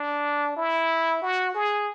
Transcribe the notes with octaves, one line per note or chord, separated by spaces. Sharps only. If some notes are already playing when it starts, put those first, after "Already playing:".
Already playing: D4
E4
F#4
G#4